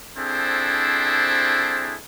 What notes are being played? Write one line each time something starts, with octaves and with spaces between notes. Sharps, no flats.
C4 D4 E4 G#4 A4 C5